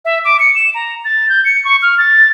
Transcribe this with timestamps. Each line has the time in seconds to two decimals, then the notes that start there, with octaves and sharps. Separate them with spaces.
0.05 E5
0.25 D6
0.40 C#7
0.55 E7
0.75 A#5
1.05 A6
1.29 G6
1.45 C#7
1.65 C#6
1.82 F6
1.98 A6